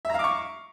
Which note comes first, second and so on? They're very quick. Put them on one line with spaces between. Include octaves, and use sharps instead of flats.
E5 A#5 F5 D6 C#6